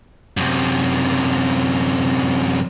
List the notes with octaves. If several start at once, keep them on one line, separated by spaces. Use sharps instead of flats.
F#2 C3